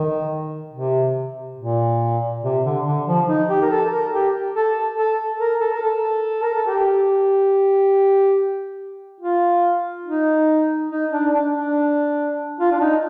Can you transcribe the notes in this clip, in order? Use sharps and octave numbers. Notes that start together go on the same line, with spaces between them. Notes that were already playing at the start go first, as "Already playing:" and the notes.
Already playing: D#3
C3
A#2
C3
D3
D3
F3
D#4
G4
A#4
A4
A#4
G4
A4
A4
A#4
A4
A#4
A4
A#4
A4
G4
F4
D#4
D#4
D4
D4
D4
F4
D4
D#4